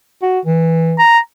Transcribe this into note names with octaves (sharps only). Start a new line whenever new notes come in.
F#4
E3
A#5